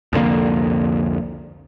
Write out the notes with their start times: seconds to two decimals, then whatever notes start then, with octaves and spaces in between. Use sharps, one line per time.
0.13 C2 F2 D3 A#3